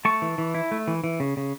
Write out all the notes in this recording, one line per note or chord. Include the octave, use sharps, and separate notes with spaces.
A3 A5 C#6
E3
E3
E4
A3
E3
E3
C#3
C#3